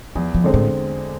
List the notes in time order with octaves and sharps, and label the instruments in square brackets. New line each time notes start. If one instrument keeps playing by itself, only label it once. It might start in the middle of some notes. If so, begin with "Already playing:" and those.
[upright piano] E2 [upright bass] F3
[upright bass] F3
[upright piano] D3 G#3 C4
[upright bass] A2